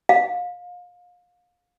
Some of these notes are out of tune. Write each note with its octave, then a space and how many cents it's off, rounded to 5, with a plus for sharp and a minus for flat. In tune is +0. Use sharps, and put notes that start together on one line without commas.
F5 +30